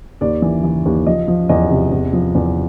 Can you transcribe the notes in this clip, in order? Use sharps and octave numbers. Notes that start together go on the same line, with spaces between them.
D#2 D5
E3
E3
D#2
F3 D#5
F3
E2 D#5
C3
E2
F3
E2